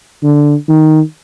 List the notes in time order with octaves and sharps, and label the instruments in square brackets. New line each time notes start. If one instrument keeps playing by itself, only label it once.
[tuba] D3
D#3